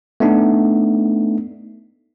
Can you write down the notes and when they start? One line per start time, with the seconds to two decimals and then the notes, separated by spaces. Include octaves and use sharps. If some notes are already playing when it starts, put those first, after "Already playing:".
0.20 A3 B3 D4 D#4